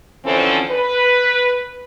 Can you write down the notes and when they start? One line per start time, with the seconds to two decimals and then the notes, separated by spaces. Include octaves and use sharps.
0.25 D3 E3 F3 C4 C#4 A4
0.71 B4